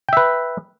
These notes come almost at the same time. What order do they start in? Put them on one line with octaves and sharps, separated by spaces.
G5 E5 B4